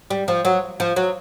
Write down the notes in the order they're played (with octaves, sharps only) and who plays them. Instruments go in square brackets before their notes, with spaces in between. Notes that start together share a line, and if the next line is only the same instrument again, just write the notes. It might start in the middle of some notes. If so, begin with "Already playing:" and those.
[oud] G3
F3
F#3
F3
F#3